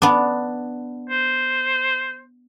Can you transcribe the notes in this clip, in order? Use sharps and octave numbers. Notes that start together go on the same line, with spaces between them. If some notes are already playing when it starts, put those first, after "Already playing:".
B3 D4
C5